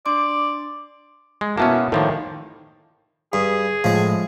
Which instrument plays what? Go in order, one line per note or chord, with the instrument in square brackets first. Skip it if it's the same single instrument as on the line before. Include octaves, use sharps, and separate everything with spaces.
[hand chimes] D4 C6 D6 [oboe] D5
[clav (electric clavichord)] G#3
[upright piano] B2 E4 A5 [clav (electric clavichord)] A#3 B3 C#4
[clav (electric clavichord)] A2 F3 A#3 [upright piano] D#3
[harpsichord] G2 [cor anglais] G#4
[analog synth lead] A2 [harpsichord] F3 G#3